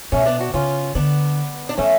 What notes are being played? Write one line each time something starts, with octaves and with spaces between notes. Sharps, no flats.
B2 A3 C#4
B3 D4
D4 F#4
C#3 C#4 F4
D3 B3 D4
D4
F3 A3 C#4